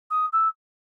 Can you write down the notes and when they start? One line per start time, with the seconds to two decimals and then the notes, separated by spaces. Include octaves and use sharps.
0.10 D#6
0.32 E6